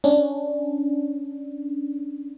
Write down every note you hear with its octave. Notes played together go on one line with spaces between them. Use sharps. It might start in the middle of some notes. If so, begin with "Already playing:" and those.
C#4 D4